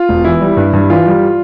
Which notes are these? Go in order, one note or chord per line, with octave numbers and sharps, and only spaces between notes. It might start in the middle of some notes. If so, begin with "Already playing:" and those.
Already playing: F4
E1
E3 E4
G3
G2
G2
E3 F4
G3